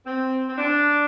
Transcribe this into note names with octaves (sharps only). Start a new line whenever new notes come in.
C4
C4
D4